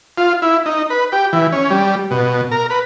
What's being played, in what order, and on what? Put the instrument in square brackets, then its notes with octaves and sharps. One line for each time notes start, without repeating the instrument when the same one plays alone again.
[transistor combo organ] F4
E4
D#4
B4
G4
E3
C#4
G3
B2
A#4
B4